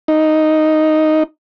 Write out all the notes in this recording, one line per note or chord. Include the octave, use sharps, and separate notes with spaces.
D#4